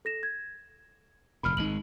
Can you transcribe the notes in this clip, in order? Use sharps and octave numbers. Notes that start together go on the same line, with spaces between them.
A4 A#6 E7
G#6
F1 A#2 B5 F6
G#1 G#3 D#4 F#7